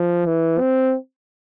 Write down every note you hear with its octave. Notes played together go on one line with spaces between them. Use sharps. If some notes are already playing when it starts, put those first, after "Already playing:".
Already playing: F3
E3
C4